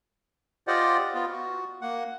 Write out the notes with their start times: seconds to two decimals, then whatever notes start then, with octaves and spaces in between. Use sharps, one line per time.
0.67 F4 G4 C5 D5 D#5 F#5
1.14 B3 F4
1.32 F#4
1.82 A#3 F#5